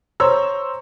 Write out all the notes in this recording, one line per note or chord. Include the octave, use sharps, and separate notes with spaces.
C5 C#5 A#5 E6